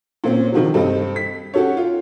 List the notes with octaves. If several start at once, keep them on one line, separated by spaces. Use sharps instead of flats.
A#2 C4 C#4
C3 D#3 F3 F#3
G2 C4 G4 A4 D#5
B6
C#4 F#4 G4 A4 C#5
F4